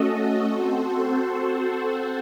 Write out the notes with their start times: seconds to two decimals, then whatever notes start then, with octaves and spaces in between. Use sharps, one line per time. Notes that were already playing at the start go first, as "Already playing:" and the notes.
Already playing: A3 C#4 F#4 A4 D#5
0.45 C4 F#4 A4 C5